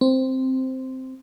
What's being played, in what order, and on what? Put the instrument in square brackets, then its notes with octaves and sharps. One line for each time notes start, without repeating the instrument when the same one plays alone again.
[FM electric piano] C4